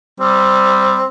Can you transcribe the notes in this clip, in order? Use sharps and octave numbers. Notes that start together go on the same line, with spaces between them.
G3 C4